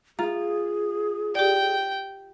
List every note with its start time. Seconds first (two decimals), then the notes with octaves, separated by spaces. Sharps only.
0.19 F4 G#4 A#5
1.35 G4 D5 G5